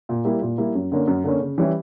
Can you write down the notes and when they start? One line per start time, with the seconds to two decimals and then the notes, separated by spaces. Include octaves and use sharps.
0.09 A#2
0.25 G3 A#3 E4
0.42 A#2
0.58 G3 A#3 E4
0.75 F#2
0.92 D3 A#3 C#4
1.07 F#2
1.24 D3 A#3 C#4
1.40 C#3
1.58 E3 G3 C#4 E4